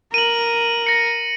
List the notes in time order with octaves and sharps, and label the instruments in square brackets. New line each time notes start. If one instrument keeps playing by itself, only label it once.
[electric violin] A#4 [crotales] D#7 F#7
[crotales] A#6 C#7